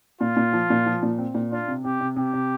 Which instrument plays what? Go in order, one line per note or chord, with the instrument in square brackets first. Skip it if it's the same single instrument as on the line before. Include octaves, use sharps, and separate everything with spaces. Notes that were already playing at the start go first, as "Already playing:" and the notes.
[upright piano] A#2 [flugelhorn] F4
[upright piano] A#2
F3
A#2
F3
A#2
C4
A#2
[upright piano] D4 [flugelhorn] F4
[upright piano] C3
[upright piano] C3 [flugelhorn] G4
[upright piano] C3
[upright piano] C3 [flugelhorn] G4
[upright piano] C3